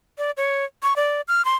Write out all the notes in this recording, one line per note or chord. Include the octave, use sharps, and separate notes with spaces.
D5
C#5
C#6
D5
F6
C6